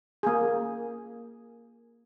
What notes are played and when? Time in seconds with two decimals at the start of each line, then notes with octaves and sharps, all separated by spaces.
0.23 A#3 G#4